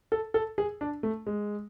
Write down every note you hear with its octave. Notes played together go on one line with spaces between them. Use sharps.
A4
A4
G#4
D4
A3
G#3